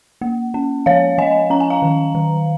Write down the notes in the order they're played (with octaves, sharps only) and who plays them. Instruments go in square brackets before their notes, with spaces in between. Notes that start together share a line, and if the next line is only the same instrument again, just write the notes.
[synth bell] A#3
C#4
F3 C#5 F5
F3 D#5 G#5
C#4 A#5
G#5
F5 A#5
D#3
D#3